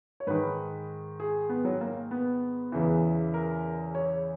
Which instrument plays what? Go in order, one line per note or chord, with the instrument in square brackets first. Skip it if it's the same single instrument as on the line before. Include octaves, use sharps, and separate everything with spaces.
[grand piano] C#5
G#2 D#3 B4
G#4
B3
F#3
A#3
B3
E2 C#3 E3
A#4
C#5